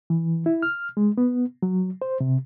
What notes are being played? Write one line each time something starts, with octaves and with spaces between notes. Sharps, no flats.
E3
E4
F6
G#3
B3
F#3
C5
C3